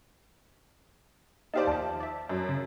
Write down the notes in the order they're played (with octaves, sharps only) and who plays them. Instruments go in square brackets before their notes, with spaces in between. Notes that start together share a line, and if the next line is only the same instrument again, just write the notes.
[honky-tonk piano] D#4 G4 D5 [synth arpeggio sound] C5 F5 A5
[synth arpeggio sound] D#2 F3 [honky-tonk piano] A5
[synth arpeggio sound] D5 E5
[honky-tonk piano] F#2
[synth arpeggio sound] C#3